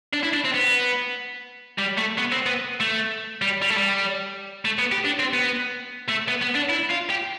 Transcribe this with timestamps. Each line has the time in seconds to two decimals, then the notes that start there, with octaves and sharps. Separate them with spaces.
0.13 D4
0.23 E4
0.34 D4
0.45 C4
0.55 B3
1.78 G3
1.97 A3
2.18 B3
2.32 C4
2.46 B3
2.80 A3
3.42 G3
3.62 G3
3.70 A3
3.77 G3
4.65 A3
4.79 B3
4.92 G4
5.05 D4
5.20 C4
5.33 B3
6.08 A3
6.28 B3
6.42 B3
6.55 D4
6.70 E4
6.91 F4
7.10 G4